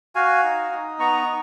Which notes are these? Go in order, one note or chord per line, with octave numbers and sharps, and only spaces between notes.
F#4 F5 G#5
D#4
D#4
B3 A#5 C#6
D#4